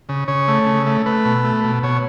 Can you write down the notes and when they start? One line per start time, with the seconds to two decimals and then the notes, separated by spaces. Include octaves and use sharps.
0.09 C#3
0.28 C#3 C#5
0.48 A3
0.66 C#3
0.86 A3
1.06 A3 B4
1.25 B2
1.44 A3
1.64 B2
1.83 B2 C#5